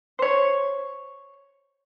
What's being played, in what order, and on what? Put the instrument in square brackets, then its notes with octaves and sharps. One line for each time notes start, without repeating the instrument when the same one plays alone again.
[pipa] C5 C#5